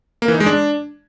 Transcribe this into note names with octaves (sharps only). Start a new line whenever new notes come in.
A#3
E3
D#4
G#3
D4